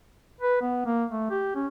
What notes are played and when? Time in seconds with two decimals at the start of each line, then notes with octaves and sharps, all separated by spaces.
0.41 B4
0.62 B3
0.86 A#3
1.11 A3
1.31 G4
1.55 C#4